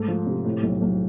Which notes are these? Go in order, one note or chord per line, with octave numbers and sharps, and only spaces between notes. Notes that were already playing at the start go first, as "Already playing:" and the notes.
Already playing: G#2 A3
F3
C3
A2
B1
B1